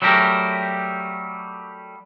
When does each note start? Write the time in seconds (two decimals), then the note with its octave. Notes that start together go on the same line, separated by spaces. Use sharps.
0.02 F#3 G3 A3 G4 A#4